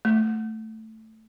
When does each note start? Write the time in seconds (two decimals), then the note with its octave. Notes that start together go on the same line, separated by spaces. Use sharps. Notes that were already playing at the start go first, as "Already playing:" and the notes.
0.05 A3